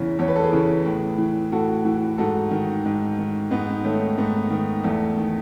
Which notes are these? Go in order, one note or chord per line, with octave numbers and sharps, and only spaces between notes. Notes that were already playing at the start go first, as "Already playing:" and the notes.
Already playing: E2 C#3 E3
E2 C#5
B4
A4
G#4 B4
C#3 E3
A2
E3
A2 F#4 A4
E3
G#2 F#4 A4
D#3
G#2
D#3
G#2 B3 D#4
D#3 A3 C#4
G#2 B3
D#3
E2 A3
D#3